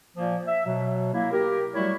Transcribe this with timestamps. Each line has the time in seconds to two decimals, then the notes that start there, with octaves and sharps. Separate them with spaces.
0.17 A#2 F3 A#3
0.47 E5
0.66 B2 F#3
1.13 A#3 E4
1.32 G4 A#4
1.74 F#3 G3 A3 E4 F#4 C#5